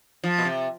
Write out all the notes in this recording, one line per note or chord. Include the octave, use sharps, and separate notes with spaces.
F3
B2
C3